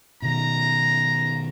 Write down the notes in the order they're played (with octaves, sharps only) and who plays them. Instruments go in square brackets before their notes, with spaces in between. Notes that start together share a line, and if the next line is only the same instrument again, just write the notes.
[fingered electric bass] B2 D#3 [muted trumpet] A#5